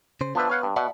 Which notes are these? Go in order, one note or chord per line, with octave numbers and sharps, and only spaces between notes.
C#3 C5
F3 B3 D4 B4 E5
C#5 F5 F#5
G2
B2 D5 E5 F#5